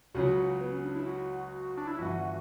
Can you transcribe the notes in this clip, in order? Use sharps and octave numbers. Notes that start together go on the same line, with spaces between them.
C#2 C#3 F#3 F#4
B3
C#4
D4
E4
F#4
D4
E4
G1 G2 E3 F#4